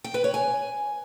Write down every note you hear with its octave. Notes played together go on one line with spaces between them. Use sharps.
G5
B4
C#5
G#5